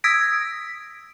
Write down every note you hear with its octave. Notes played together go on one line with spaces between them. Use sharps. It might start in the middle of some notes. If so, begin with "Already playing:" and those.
D#6 E6 G#6 A#6 B6 D7